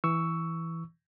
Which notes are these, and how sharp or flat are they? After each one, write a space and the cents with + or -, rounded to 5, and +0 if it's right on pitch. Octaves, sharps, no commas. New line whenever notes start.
E3 +0 C#6 +15 E6 +0